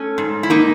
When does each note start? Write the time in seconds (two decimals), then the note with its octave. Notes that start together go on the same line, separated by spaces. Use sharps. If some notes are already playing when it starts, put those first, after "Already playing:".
Already playing: A3 C#4
0.18 G#2
0.43 E4
0.50 A#3 D#4